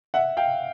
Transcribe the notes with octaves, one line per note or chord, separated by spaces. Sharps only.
E5 F#5
F5 G5